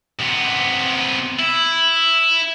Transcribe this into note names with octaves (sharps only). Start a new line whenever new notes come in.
C3 B3
E4